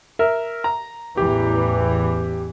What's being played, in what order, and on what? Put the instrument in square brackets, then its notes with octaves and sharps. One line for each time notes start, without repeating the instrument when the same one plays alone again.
[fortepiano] A#4 E5
A#5
[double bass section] A1 E2 E3 [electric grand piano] G4